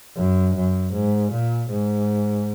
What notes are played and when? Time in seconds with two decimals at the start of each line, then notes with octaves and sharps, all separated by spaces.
0.15 F#2
0.55 F#2
0.93 G#2
1.32 A#2
1.70 G#2